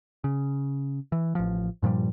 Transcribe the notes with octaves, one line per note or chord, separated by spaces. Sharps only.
C#3
E3
A1 F3
G2 A#2 F3 G3